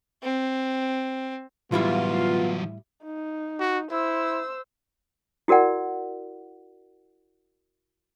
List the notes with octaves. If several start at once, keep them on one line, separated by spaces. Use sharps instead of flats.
C4
A2 E3 F#3 G3 B3 E4 F4
D#4
F#4
E4 C5 E6
E4 F#4 A#4 D5 F#5